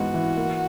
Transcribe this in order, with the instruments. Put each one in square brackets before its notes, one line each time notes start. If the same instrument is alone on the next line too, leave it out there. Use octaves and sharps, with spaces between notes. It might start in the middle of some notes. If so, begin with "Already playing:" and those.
Already playing: [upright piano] G#2 E3 B3 [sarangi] F#4
[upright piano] E3
A#3